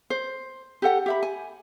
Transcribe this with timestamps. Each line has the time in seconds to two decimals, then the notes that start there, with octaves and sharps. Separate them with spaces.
0.10 C5
0.82 G4 A4 F#5
1.06 G4 E5 B5
1.23 G#5